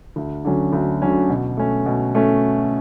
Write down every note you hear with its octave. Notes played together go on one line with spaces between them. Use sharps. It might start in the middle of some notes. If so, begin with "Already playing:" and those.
D2
D3 F#3 C#4
D2
D3 F#3 C#4
B2
A3 C#4
B2
A3 C#4